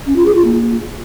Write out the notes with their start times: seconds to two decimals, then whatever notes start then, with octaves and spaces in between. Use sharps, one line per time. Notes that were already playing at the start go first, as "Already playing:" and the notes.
0.06 C#4
0.16 F4
0.26 G#4
0.35 F4
0.45 A#3